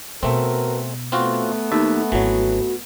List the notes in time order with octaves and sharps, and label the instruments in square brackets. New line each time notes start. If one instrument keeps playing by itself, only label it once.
[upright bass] B2 [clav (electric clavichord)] A3 C4 [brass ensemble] F#4 A#4 B4
[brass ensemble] A3 B3 [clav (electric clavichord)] C4 F4 F#4
[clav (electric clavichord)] D#2 E5 A5 [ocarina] D#4
[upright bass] G#1 [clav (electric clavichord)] E3 F#3 [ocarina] F#4